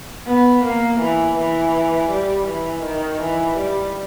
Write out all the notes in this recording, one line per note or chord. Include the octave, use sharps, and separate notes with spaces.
B3
A#3
E3
E3
G3
E3
D#3
E3
G3